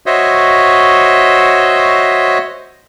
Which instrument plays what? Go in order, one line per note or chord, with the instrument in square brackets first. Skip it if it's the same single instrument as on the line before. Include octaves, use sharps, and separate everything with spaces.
[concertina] F#4 C5 C#5 D#5 E5